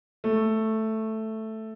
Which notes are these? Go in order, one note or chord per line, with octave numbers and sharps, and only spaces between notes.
A3